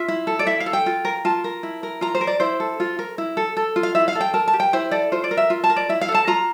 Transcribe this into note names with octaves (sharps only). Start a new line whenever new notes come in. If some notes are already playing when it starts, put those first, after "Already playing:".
Already playing: F4 E5
E4
A4
D5
E4 E5
F5
A4
G5
F4
A#4
F4 A5
A#4
E4
A#4
F4 A#5
C5
A#4
D5
E4 C5
A4
F4
A#4
E4
A4
A4
F4
F5
E4 E5
F5
A4
G5
A#4 A5
A5
G4
G5
E4 C5
A4 D5
F4 C5
D5
A#4
E5
F4
A5
A#4
D5
E4 E5
F5
A4
A5
F4 A#5